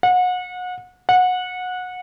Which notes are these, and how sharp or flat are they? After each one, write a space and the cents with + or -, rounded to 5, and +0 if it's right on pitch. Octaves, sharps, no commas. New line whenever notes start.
F#5 -30
F#5 -20